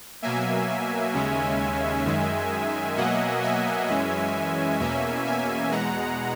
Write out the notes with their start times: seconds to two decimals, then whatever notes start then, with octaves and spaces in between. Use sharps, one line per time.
0.22 B2 F#3 A#3 E5 G#5
1.14 D#2 C#3 G#3 C#4
2.06 F#2 D#3 G#3
2.97 B2 F#3 A#3 D#5 F#5
3.42 E5 G#5
3.89 F#2 E3 G#3 C#4
4.79 E2 B2 A#3 C#4 E5 G#5
5.26 E5 G#5
5.71 E2 B2 G#3 F#5 A#5